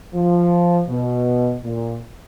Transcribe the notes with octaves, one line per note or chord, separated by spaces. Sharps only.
F3
B2
A#2